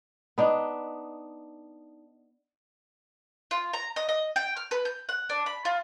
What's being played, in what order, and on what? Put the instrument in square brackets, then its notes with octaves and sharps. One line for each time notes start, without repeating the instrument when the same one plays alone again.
[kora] B3 D4 D#4
[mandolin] F4
A#5
D#5
D#5
G5
F6
B4
G6
F#5
D4
B5
F4